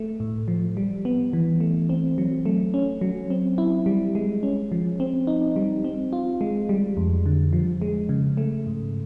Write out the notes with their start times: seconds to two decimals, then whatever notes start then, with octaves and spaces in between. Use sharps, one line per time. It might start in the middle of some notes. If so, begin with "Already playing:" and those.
Already playing: A3
0.20 A2
0.48 F3
0.77 G3
1.05 B3
1.33 E3
1.60 A3
1.89 C4
2.18 F#3
2.46 A3
2.74 C#4
3.01 F#3
3.30 C4
3.58 E4
3.86 G3
4.15 G#3
4.43 C#4
4.72 F3
5.00 C4
5.27 D#4
5.56 G3
5.84 C4
6.13 F4
6.41 G#3
6.69 G3
6.97 F2
7.26 D3
7.53 F3
7.82 G#3
8.09 C#3
8.37 A3
8.67 G#2